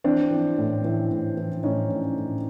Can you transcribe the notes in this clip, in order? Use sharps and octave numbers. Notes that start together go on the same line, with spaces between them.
E3 C4 D4
E3
A2
E3
A2
E3
A2 C#4 D#4
A2
A2